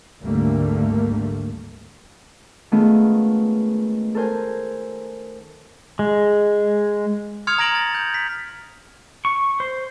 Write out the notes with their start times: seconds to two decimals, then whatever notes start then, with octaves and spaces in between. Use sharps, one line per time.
0.21 G#1 D2 D3 G3 A3 A#3
2.72 D#3 G#3 A3 B3 C#4 F4
4.15 A4 A#4 C5 G#5
5.99 G#3
7.47 C6 D#6 F6 G#6 C#7 F7
7.58 A#5 G#6 A#6 D7 F#7
7.75 A6
7.95 G6
8.14 B6
9.25 C#6
9.60 C5